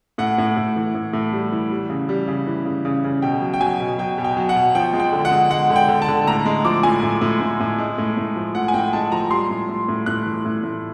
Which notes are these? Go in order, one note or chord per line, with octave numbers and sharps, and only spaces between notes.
A2 F#5
A2
A2
E3
A2
A2
G3
E3
G3
C#3
G3
C#3
E3
C#3
C#3
C#3
B2 G5
F#3
G5
F#3 G#5
B2
F#3 G5
B2
G5
F#3
F#5
B2
F3 G5
G#3
G5
D3
F#5
G#3
G#3 F#5
D3
G5
D3
A5
D3
A2 A#5
G#3
F3 D6
A2 G#5
A2
A2
A2
A2
G#3
A2
A2
F3
A2 F#5
G#5
A2 G5
G#3 A5
F3 A#5
G3 C6
A2
A2
A2
A2 F#6
E3
A2
A2